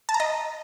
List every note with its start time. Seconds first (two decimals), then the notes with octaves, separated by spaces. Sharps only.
0.09 A5
0.14 A#5
0.20 D#5